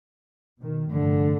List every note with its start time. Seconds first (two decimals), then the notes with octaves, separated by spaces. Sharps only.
0.59 B2 D#3
0.91 F1 G2 D3 A3